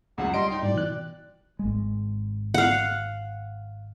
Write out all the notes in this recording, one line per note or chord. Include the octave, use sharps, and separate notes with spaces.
C#2 F#2 F#5
G3 D#5 C6 D7
D#4 G5
G#2 G3 D5
B2 E3 F#6
G#1 G#3
F5 F#5